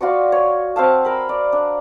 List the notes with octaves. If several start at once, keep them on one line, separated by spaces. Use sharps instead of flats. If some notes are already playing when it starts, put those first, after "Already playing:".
F4 F#4 D5 C#6
C#5
C4 E5 F5 A5
A#4 B5
D5
D4